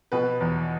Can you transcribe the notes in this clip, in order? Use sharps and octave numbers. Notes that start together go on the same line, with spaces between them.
B2 B4
E2